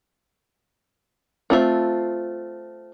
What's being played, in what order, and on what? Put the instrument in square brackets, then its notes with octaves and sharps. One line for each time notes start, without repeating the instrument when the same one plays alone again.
[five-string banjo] A3 C4 F4 G#4 E5